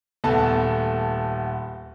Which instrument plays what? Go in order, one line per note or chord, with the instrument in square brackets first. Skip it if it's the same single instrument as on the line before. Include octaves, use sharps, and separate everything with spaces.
[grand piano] D#1 A3 B3 A5